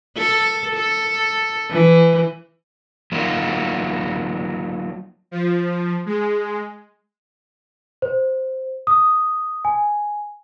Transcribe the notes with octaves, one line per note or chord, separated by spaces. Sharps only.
A4
A4
E3
F#3 A#3 D#4 F4 F#4
F3
G#3
C5
D#6
G#5